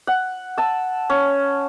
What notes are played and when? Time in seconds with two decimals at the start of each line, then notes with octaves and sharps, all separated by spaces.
0.07 F#5
0.58 A5 E6
1.10 C#4